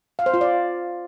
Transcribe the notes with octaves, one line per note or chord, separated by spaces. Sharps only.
F5
C5
F4
D5